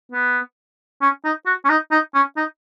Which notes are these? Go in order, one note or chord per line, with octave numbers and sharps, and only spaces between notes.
B3
C#4
D#4
F#4
C#4
D#4
D#4
C#4
D#4